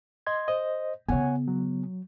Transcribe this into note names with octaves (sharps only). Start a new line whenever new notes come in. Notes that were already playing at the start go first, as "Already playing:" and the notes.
D#5 C6 G#6
C5 D#5
C#3 B3 C#5 F#5 G#5
F#3